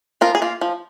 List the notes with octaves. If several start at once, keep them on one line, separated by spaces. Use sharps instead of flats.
F3 F4 A#4
G#4
A#3 F4
F3